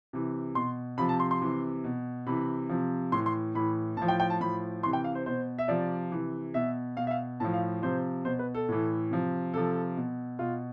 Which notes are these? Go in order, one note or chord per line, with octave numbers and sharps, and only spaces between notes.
C3 E3
B2 C6
C3 F3 B5
A5
C6
C6
C3 E3
B2
C3 E3 B5
C3 F3
A2 E3 C6
C6
A2 E3 B5
A2 F3 A5
G5
G5
A5
A2 F3 B5
C3 E3 C6
G5
F5
C5
B2 C5
E5
C3 F3 D5
C3 E3
B2 E5
B2 F5
E5
F5
A2 F3 A5
F5
C3 F3 C5
B2 C5
B4
A4
A2 E3
C3 F3
C3 F3 A4
B2
B2 F4